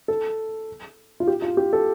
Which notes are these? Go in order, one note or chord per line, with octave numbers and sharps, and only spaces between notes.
A4
F4
G4
F4
G4
A4